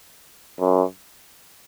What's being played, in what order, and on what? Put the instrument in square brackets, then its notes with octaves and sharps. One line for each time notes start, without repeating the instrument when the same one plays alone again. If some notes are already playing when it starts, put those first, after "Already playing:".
[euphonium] F#2